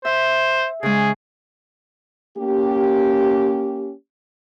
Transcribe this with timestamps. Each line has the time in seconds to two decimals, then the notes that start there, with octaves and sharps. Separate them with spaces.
0.05 C5 E5
0.83 C#3 G#3 G#4
2.37 A#3 C#4 G4